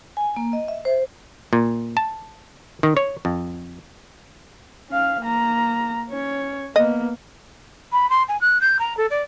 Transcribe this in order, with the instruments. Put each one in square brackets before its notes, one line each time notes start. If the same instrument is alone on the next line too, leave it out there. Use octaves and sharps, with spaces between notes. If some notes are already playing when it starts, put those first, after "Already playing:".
[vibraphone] G#5
A#3
D#5
E5
C5
[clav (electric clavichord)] A#2
A5
D#3
C#5
F2
[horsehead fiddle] C#4 F5
A#3 A#5
C#4 C#5
[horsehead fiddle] A#3 B3 [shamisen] D#5
[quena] B5
C6
G#5
F#6
G6
A#5
A4
D5